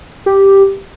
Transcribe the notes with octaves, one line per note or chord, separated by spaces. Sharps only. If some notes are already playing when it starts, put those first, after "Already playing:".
G4